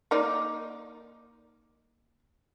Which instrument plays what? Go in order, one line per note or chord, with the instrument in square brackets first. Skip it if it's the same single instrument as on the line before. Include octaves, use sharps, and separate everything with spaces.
[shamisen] A#3 D#4 D5